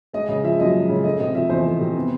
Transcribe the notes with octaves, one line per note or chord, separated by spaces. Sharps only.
G#3 D#5
C#3 D#5
F3 E5
F#2 D#5
G#3
C#3
A3 D#5
C3 D#5
F3 E5
E2 C5
A3
C3
B3